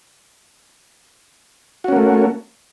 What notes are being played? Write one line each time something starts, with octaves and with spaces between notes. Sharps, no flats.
A3 A#3 C#4 F#4